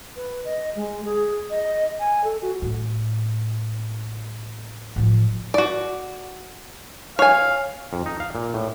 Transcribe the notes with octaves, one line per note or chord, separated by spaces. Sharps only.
B4
D#5
G#3
G#4
D#5
G#5
A4
F#4
A2
A2 F3
F#4 D5
C#5 F5 G#5
F2
D#4
F5
A#2
A2